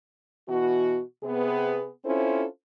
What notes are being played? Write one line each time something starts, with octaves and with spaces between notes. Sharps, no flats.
B2 E3 B3 F#4
C3 B3 G#4
C4 C#4 E4 F4 A4 C5